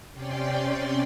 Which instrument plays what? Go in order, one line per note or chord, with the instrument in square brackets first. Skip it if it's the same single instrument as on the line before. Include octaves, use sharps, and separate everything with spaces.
[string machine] C3 C#4 D5 G5 C6